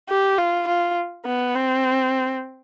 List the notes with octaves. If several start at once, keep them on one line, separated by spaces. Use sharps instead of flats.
G4
F4
F4
B3
C4